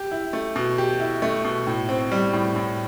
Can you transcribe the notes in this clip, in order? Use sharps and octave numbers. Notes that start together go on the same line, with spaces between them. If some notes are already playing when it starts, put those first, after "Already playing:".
Already playing: G4
E4
A3
B2
G4
E4
A3
B2
A2
C4
G3
A2
A2